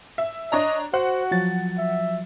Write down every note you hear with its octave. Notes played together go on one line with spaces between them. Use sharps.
E5
D4 C#5 D#5 A#5
F#4 C5 F#5
F3 F#3 A6
E5